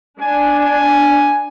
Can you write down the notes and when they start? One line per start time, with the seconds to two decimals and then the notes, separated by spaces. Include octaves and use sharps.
0.20 D4 G#5
0.59 G#5